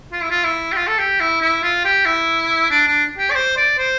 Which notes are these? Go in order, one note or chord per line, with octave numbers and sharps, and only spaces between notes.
F4
E4
F4
E4
G4
F4
A4
G4
E4
E4
F4
G4
E4
D4
D4
G4
D5
C5
D5
C5